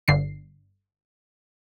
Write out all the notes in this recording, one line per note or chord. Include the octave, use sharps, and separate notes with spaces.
G1 D3 C7